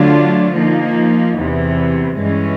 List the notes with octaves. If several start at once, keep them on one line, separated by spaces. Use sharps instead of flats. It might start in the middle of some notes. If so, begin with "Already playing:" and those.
Already playing: D3 F#3 A3 D4 F4
F3 A#3 D#4
E2 C3 E3
G2 E3 G#3 C#4